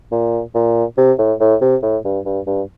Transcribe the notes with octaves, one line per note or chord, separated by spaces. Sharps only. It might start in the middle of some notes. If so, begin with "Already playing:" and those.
A#2
A#2
C3
A2
A2
C3
A2
G2
G2
G2